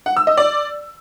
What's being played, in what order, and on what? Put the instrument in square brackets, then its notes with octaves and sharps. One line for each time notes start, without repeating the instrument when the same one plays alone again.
[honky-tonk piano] F#5
E6
D#5
D5